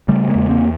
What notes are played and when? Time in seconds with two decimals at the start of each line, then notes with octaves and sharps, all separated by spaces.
0.08 C#3 G3 A3
0.29 G#3 A#3
0.35 E2
0.49 A#3 C4